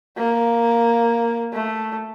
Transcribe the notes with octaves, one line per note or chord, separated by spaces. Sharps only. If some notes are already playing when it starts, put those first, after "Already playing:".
A#3
A3